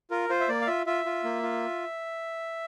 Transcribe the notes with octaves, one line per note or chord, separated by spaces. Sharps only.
F4 A#4
F4 C5
E5
A#3 D5
F5
F4 E5
F4 E5
F4
A#3
F4